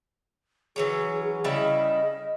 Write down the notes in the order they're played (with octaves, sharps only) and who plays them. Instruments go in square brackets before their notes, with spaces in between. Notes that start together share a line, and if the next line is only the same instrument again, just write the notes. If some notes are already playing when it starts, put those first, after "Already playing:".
[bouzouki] E3 F#3 C#4 [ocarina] G#4
[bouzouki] C#3 G3 E4 [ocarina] D#5